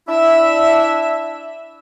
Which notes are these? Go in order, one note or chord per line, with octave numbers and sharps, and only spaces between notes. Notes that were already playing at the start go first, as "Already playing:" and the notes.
D4 E4 E5